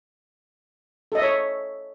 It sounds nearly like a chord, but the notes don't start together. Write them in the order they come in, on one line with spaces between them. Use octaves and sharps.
A4 D#5 E5 C#5